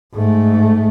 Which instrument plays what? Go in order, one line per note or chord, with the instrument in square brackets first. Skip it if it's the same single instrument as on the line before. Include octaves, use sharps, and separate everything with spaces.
[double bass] G#2 A3